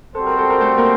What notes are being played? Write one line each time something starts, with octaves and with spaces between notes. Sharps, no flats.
G3 C4 F#4 A4 C5
A#4
A4
A#4
A3 A4
A#3 A#4